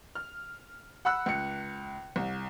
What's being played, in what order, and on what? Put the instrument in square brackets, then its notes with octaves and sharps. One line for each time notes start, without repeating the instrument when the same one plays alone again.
[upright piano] F6
F#5 B5 E6 F#6
C#2 C#7
C2